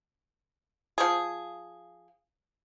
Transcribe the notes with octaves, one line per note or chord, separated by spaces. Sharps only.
F3 G#4